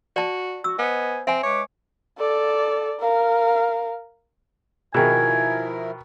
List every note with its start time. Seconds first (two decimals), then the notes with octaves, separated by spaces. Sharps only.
0.16 F#4 D5 A5
0.64 F#4 E6
0.79 B3 C5 D#5 G#5
1.27 C4 E5 G#5
1.43 G#3 B4 C#5 D6
2.18 A4 D5
3.00 A#4 F5
4.94 B2 D#3 F3 E4 G#4 A#4 G5 G#5